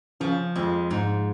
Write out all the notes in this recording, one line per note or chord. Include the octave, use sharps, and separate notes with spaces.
C#3 F3
F2 G#3
G#2